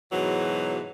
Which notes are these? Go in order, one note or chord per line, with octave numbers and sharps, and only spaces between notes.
G#2 B2 E3 F#3